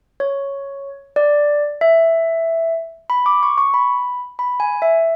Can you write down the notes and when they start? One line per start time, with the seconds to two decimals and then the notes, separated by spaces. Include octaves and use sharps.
0.20 C#5
1.16 D5
1.81 E5
3.10 B5
3.26 D6
3.43 C#6
3.58 C#6
3.74 B5
4.39 B5
4.60 G#5
4.82 E5